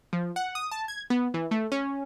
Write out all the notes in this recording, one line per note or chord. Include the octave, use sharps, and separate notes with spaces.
F3
F#5
D#6
A5
G#6
B3
E3
A3
C#4